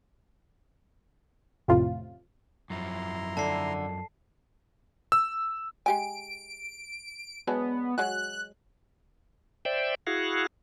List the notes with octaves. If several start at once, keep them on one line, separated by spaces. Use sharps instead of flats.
A1 F2 A2 C3 F4
F#2 F3 E4 A#5 C6
D3 A5 C7
E6
G#3 G4 G#5 D7
F#3 G#3 B3 D4
F#3 G#3 F#4 F#6
C5 D5 E5 G5
E4 F#4 G#4 F5 F#5